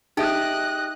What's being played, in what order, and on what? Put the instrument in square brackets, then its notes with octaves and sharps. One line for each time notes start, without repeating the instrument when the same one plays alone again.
[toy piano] D#4 G#4 E5 [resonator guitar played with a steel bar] G4 [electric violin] D#5 F#6